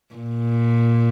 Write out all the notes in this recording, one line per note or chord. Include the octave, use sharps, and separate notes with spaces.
A#2